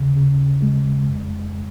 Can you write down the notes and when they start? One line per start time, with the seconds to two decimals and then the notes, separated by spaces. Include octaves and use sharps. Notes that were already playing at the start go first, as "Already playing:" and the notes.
Already playing: D#2 C#3
0.16 C#3
0.62 G#3
1.09 F2